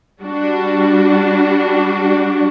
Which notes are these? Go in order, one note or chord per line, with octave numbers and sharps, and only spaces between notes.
G3 D4 F#4